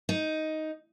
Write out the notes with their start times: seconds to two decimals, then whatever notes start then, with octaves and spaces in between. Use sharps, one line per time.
0.09 D#4